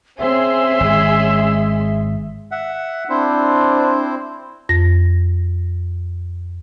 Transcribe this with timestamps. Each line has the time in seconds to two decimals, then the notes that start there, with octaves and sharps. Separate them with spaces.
0.19 C4 C#4 G#4 E5 C6
0.81 G#1 G#3
2.51 E5 F#5
3.10 C4 D4 E4 C5
4.69 F2 A#6